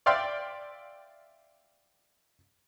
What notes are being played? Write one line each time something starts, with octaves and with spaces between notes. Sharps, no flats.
D5 E5 F5 G5 C6